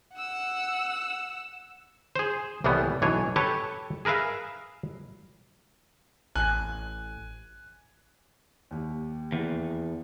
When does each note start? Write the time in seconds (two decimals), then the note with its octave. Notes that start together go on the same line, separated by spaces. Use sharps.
0.14 F#5 E6
2.16 G#4 C5
2.64 C2 A2 E3 G3 B3
3.02 B1 E3 D4 C#5 G#5
3.36 G4 A4 B4 C#5 A5
4.05 G#4 A#4 B4 E5 F5
6.35 A1 G#5 F#6
8.71 D#2 G4
9.32 E2